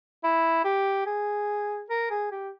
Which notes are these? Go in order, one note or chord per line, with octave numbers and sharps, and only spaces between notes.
E4
G4
G#4
A#4
G#4
G4